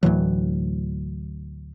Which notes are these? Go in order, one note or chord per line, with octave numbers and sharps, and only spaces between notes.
D2 A2 E3 F#3